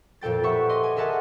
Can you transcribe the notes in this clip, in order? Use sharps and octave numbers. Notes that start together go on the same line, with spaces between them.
F2 A#2 A4 G5 A6
G4 B4 E5 F#5 C#6
D#5 C6 D6
G#5
G#4 A#4 E5 F#5 A5